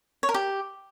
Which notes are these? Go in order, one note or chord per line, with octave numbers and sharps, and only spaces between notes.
C#5
A#4
G4